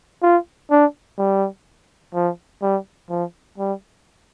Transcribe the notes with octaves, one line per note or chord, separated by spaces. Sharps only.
F4
D4
G3
F3
G3
F3
G3